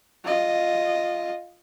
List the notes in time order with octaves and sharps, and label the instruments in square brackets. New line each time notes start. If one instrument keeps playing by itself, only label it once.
[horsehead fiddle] F4 D#5